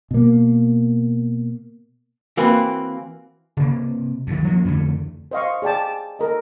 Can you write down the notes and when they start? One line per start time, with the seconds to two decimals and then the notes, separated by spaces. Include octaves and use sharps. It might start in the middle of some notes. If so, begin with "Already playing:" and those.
0.11 B2 A#3
2.37 E3 A#3 C4 F#4 B4
3.57 C3 A#3
4.27 D2 D#3
4.45 F3 F#3 A#3 C#4
4.64 F2 D3 E3 A3
5.31 C5 D#5 F5 C#6
5.62 G#4 D5 G5 A5
6.19 A4 A#4 D#5